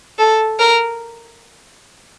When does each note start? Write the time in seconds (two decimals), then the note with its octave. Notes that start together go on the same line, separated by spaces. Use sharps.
0.19 A4
0.59 A#4